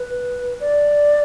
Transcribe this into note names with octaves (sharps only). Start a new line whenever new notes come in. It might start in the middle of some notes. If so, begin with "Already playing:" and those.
Already playing: B4
D5